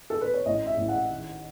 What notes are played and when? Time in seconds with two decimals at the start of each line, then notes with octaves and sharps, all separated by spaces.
0.10 A4
0.21 B4
0.34 C#5
0.46 A1 D#5
0.66 E5
0.77 A1
0.88 F#5
1.10 D#3